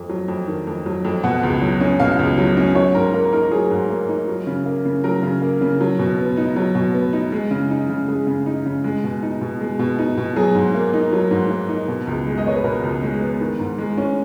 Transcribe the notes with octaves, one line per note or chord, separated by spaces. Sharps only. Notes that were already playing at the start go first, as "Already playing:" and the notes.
Already playing: F2
F#3
F2
D#3
F2
F#3
F2
B2 F#5
C#2
F#3
C#4
B2 F5
C#2
F#3
C#4
F#3 C#5
G#2 A#4
A#3 A#4
D#4 A#4
F#3 G#4
G#2
A#3
D#4
F#3
C#3
A#3
C#3
F#3 A#4
C#3
A#3
C#3
F#3
B2
B3
D#4
F#3
B2
B3
D#4
G#3
C#3
D#4
C#3
G#3 G#4
C#3
D#4
C#3
G#3
B2
D#4
B2
G#3
B2
D#4
B2
F#3 G#4
G#2
A#3
D#4
F#3
G#2
A#3
D#4
B2
C#2
G#3
D#5
B3 C#5
B4
B2 A#4
C#2
G#3
B3
D#3
G#2
G#3
C#4